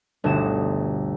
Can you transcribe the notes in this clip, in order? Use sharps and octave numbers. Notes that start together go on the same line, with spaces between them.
G1 D2 B2 C#5 D#6 E7